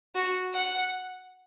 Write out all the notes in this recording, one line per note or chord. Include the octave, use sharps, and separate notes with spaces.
F#4
F#5